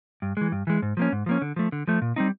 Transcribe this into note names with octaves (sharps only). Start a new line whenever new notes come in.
G2
E3 G#3
G2
E3 G#3
G#2
F3 A#3 C#4
G#2
F3 A#3 C#4
D3
F3 A3
D3
F3 A3
A#2
G3 C4 D#4